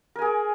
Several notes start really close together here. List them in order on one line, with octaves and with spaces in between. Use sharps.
A#4 G#5 G#4